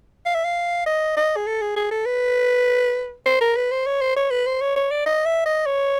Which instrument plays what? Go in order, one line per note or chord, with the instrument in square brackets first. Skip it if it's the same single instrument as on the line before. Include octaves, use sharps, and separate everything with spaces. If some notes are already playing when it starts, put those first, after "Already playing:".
[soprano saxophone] F5
E5
F5
D#5
D#5
G#4
A4
G#4
G#4
A4
B4
C5
A#4
B4
C5
C#5
C5
C#5
B4
C5
C#5
C#5
D5
D#5
E5
D#5
C#5